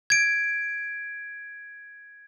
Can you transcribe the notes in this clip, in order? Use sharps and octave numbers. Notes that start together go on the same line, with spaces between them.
G#6 D7